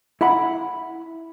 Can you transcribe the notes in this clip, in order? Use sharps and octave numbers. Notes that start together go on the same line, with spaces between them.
E4 E5 F#5 B5